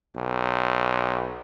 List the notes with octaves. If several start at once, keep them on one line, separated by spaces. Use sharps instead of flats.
B1